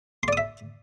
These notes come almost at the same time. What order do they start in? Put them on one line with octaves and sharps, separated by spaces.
C6 D5 D#6 E5